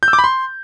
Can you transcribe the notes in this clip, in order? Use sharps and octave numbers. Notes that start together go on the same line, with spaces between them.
G6
E6
D6
B5
C6